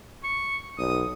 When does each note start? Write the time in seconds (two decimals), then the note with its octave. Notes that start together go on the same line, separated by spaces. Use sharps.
0.23 C#6
0.78 B1 D#6